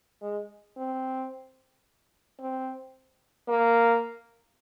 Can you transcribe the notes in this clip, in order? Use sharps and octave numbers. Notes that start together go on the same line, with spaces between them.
G#3
C4
C4
A#3